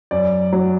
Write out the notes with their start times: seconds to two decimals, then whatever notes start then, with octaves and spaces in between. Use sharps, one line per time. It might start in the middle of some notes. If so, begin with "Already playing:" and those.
0.11 F#2 D5
0.52 F#3